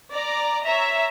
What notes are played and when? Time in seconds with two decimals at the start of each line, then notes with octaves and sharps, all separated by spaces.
0.11 D5 A#5
0.64 C#5 E5 A#5